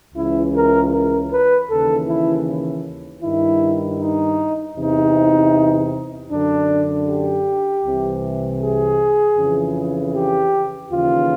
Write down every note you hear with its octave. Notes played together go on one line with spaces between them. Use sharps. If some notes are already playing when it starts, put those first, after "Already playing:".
C#2 C#3 E3 E4
A#4
A#4
B4
D#2 C#3 E3 A4
E4
G2 D#3 E4
D#4
E2 C3 E3 D#4
F#2 D3 D4
G4
C2 C3 E3
G#4
F2 C#3 E3
G4
D#2 C#3 E3 F4